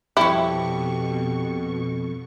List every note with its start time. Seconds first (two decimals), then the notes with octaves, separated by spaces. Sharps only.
0.17 F2 B2 E4 G4 C#5 C#6